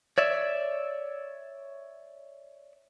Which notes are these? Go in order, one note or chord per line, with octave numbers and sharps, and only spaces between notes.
C#5 D5 E5